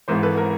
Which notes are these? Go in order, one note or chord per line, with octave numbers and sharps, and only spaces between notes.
G#1 G#2 E3 A#4 C5
A4 B4
A#4